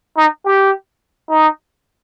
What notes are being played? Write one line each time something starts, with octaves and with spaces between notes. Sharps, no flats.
D#4
G4
D#4